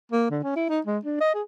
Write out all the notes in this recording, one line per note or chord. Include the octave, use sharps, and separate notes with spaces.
A#3
D3
C#4
E4
D#4
G#3
D4
D#5
G#4